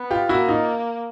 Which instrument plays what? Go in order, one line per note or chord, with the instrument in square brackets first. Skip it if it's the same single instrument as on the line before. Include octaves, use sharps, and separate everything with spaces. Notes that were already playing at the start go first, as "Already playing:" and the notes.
Already playing: [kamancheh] B3
[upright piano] F4 G4
[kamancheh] A#3 [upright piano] E4 F#4
[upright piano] D#4 F4